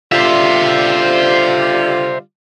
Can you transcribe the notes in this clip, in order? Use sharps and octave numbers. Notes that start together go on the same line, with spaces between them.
D3 G3 F4 C5 E5